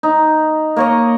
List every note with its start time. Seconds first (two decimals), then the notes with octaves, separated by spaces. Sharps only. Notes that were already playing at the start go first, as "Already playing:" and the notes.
0.03 D#4
0.76 A#3 C#5 D#5